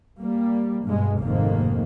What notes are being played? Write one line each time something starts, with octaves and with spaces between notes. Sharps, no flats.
G3 A#3
G2 B2 G#3
F1 F2 G#2 D#3 A#3